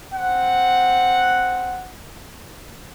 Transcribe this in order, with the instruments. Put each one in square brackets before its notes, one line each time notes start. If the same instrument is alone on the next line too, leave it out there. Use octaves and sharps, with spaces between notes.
[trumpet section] C4 F#5